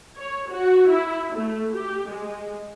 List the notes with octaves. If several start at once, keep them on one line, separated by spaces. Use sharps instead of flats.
C#5
F#4
E4
A3
G4
G#3